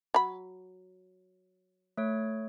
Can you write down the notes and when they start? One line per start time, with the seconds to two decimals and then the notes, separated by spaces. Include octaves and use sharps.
0.14 F#3 B5
1.98 A3 C#5